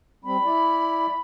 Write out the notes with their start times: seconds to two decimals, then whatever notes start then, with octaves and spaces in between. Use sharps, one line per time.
0.25 G3 C4 B5
0.44 E4 D5